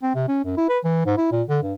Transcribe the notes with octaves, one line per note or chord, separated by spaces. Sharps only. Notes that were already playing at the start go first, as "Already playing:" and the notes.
C4
C3
C#4
F#2
E4
B4
E3
G#2
E4
A#2
D3
G2